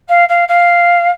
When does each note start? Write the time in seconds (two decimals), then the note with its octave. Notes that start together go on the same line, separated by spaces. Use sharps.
0.08 F5
0.28 F5
0.48 F5